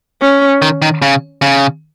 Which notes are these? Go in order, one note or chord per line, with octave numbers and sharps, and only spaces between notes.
C#4
D#3
D#3
C#3
C#3